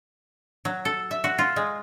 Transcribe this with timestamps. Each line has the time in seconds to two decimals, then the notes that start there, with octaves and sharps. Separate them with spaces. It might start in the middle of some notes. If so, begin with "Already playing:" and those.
0.65 F#3
0.85 A4
1.11 E5
1.24 F#4
1.38 F4
1.56 G#3